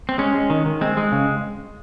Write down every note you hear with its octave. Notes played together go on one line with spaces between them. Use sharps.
C4
G#3 C#4
G#3
D#3
D#3
G#3 C4
G#3
C#3